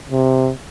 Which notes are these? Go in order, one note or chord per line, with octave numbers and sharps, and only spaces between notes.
C3